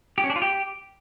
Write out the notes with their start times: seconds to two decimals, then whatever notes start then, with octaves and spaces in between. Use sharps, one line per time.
0.18 G4
0.24 C#4
0.30 D4
0.36 F4
0.42 G4